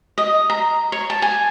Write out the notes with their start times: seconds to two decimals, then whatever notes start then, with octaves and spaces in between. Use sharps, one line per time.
0.18 D#5
0.50 A#5
0.92 C#5
1.10 A5
1.22 G#5